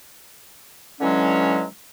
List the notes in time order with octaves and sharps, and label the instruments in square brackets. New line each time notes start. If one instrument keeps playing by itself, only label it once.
[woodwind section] D3 E3 F#3 G#3 C#4